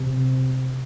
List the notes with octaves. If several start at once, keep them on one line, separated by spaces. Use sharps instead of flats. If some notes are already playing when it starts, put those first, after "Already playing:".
Already playing: C3